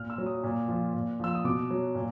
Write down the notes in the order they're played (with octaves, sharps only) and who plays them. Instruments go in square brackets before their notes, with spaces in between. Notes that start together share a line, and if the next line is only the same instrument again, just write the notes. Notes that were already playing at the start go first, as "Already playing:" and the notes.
Already playing: [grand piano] A#2 F6
E6
F#3
D#6
A#2
F3
A#2
F3 E6
D#6
B2 D6
F#3
A#2